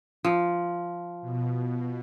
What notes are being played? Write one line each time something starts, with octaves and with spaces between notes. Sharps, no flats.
F3
B2